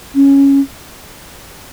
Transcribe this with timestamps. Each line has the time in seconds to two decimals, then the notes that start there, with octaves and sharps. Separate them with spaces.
0.15 C#4